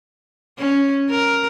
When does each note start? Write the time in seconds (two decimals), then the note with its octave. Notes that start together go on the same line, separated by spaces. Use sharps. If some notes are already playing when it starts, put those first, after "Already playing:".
0.59 C#4
1.10 A#4